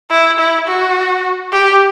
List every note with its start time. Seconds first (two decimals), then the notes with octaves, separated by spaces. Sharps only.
0.11 E4
0.39 E4
0.68 F#4
1.52 G4